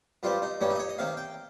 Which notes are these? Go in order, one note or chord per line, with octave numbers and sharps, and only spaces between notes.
G2 G3 C4 F4
D#4
G2 G3 A#3 C#4
D#4
D#5
C#5
D#5
C3 D#3 A#3 F5
G5